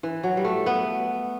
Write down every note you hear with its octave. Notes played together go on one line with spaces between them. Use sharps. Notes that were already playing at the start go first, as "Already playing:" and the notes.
E3
F#3
G3
A3
B3